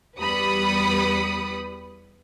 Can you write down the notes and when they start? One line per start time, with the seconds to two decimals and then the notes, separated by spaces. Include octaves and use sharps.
0.20 E2 G3 B4 B5 D#6 C#7